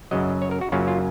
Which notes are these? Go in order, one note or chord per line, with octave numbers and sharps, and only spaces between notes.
F#2 C#3 F#3 D#5
C#5
A#4
F#4
F#2 C#3 F#3 A#3 C#4 F4
F4